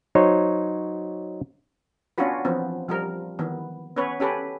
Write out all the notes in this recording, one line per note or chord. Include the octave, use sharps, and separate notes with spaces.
F#3 D#4 C5 C#5
B3 C#4 D4 F4 F#4 B4
E3 F3 B3 C4
F3 G3 A#4
D#3 E3 B3
B3 C#4 B4 C#5
C#4 G4 A4 B4